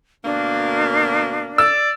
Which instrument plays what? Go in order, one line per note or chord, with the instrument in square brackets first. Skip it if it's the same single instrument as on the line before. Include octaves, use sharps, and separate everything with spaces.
[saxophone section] D2 B2 A#3 [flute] D4
[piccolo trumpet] D5 [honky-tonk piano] E6